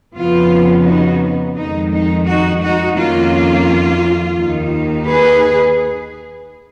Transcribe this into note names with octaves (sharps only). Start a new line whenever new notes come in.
F2 C#3 F3 B3 F4
D#4 F#4
F2 D#3 G#3 D#4
D#4
D#4 F#4
D#4 F#4
F2 D#3 A#3 C#4 F4
D#2 D#3 A#3 D#4
G#4 B4